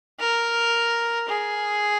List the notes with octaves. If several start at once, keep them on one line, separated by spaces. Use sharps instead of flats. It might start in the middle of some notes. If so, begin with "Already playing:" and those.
A#4
G#4